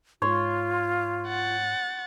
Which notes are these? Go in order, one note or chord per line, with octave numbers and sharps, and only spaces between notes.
G#2 F4 C#5 C6
F#5 A6